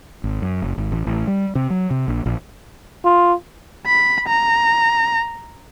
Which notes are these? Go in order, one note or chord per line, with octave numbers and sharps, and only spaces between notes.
G#1
F#2
F#1
G#1
A1
A1
G3
C3
F#3
C3
A#1
A#1
F4
B5
A#5